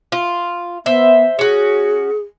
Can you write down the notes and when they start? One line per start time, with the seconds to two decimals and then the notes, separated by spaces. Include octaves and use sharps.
0.12 F4
0.86 B3 C5 E5
1.39 C#4 F#4 G#4